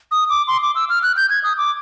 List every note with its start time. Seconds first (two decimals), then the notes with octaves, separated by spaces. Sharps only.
0.11 D#6
0.30 D6
0.48 C6
0.62 D6
0.75 E6
0.89 F6
1.03 F#6
1.17 G6
1.30 G#6
1.44 D#6
1.58 D6